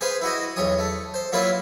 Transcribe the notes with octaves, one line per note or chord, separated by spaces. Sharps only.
G#4 B4 C5 F5
E4 F#4 D#5
B1 E2 C#5 D#6
A3
C5
F#3 A#3 E4 F4 A#4 B4